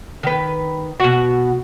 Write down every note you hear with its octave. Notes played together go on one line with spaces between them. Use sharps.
D#3 B4
B2 F#4